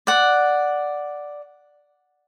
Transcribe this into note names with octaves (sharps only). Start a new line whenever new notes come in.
D5 F#5